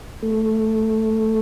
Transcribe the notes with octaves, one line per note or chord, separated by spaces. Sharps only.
A3